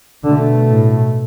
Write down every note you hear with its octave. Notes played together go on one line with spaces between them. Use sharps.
B2 D3 A3
A2